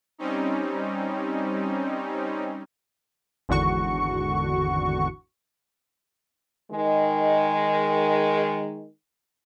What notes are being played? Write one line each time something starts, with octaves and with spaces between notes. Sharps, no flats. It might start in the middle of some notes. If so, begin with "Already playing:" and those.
G3 C4 C#4 D#4
G#1 E2 D3 F#4 C#6
D#3 G#3